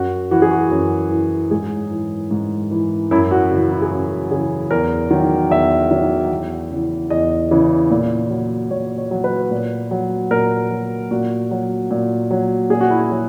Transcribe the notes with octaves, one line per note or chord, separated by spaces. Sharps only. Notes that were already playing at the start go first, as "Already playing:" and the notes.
Already playing: F#2 F#4
E3 F#4
G#4
F#4
F#2
E3
G#2 G#4
E3
G#2
E3
F#2 E4
F#4
C#3 E3
E4
G#4
F#2 F#4
C#3 E3 G#4
E2 A#4
D#3 F#3
E2 E5
D#3 F#3
E2
C#3 E3
E2 D#5
C#3 E3
A#2
F#3
A#2 C#5
C#5
F#3
B4
A#2
F#3
A#2 A#4
F#3
A#2 F#4
F#3
A#2
F#3
A#2 G#4
F#4
E4
F#4
F#3